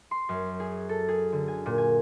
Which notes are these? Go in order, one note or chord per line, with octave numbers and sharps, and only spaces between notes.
C6
F#2
G#4
A4
G#4
D3
G#5
A#2
G#5